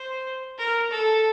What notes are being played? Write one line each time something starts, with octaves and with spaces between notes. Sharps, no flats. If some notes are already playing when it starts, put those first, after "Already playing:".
Already playing: C5
A#4
A4